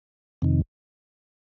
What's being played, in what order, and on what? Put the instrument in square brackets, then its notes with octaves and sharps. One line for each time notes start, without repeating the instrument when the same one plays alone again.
[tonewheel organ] F2 C3 D#3